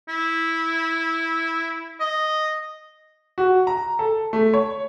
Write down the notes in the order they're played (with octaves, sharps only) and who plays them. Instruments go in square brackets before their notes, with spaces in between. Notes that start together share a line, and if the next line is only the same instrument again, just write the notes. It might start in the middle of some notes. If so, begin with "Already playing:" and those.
[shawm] E4
D#5
[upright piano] F#4
A#5
A4
A3
C#5